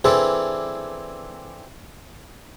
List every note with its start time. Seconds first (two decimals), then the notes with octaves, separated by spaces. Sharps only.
0.04 E3 C4 D4 G#4 A4 B4